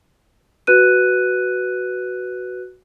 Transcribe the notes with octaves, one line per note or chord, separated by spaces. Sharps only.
F#4 B4 F#6 D#7